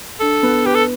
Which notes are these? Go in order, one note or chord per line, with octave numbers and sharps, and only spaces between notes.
D4 A4
B3
G4 B4
A4